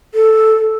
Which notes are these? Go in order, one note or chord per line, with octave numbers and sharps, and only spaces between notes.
A4